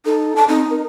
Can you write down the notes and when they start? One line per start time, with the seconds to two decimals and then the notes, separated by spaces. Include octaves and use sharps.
0.06 D#4 A4
0.36 A5
0.49 C4 D#4
0.70 A#4